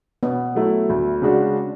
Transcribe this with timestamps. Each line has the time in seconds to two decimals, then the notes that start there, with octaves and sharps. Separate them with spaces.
0.23 B2 B3
0.55 F#3 A3 E4
0.89 D2
1.22 C#3 G#3 D4 F#4